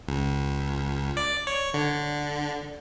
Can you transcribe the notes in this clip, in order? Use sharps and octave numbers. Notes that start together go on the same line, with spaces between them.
C#2
D5
C#5
D3